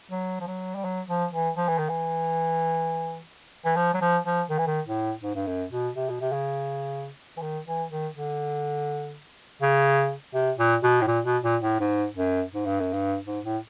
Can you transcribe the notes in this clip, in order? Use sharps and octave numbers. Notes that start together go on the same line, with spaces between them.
F#3
F3
F#3
G3
F#3
F3
E3
F3
E3
D#3
E3
E3
F3
F#3
F3
F3
D#3
E3
D#3
A2
G#2
G2
F#2
B2
C3
B2
C3
C#3
E3
D#3
E3
D#3
D3
C#3
C3
A#2
B2
A2
A#2
B2
A#2
A2
G#2
F#2
G#2
G2
F#2
G2
G#2
A2